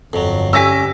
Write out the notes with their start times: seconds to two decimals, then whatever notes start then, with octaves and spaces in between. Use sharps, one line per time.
0.13 G1 F2 F#3
0.53 C#4 G4 G#5 D6 E6 A#6 B6